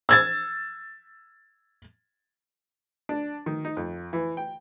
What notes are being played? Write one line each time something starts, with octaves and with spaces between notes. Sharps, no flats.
E6 G#6 A6
D4
D#3
D#4
F2
E3
G5